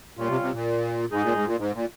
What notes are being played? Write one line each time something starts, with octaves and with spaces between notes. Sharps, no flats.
A#2 G3 C#4 F4
C3
C3
A#2
G#2 G#3 D#4 G#4
A#2
G#2
A#2
G#2
A#2